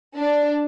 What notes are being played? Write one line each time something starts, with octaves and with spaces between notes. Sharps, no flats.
D4